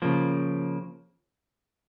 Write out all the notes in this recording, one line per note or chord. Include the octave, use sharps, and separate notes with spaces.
C#3 F3 A#3